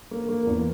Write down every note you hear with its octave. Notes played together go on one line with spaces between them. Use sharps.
A#3
A#3
E2